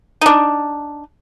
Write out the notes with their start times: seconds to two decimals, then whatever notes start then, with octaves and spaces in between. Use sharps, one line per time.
0.21 D4 D#4